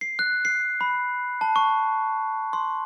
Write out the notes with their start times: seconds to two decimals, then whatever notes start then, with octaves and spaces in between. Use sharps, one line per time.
0.01 C7
0.19 F#6
0.45 C7
0.81 B5
1.41 A5
1.56 C#6
2.53 C6